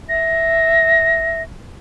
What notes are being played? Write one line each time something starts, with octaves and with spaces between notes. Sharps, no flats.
E5 A#6